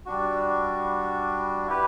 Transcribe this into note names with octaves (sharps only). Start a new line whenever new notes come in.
G3 D4 F#4
E4 G4 B4